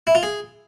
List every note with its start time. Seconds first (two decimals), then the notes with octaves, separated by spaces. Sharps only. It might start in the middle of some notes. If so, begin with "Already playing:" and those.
0.07 E4
0.15 F4
0.23 G#4